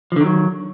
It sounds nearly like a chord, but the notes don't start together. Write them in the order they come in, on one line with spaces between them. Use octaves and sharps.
F3 D3 D#3 F#3